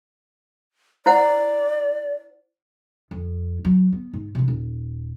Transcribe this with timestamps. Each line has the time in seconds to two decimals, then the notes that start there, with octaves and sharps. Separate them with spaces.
1.06 E4 C5 D5 F#5
3.11 F2
3.65 F#3
3.92 B3
4.13 G#2
4.35 C3 E3
4.48 D#1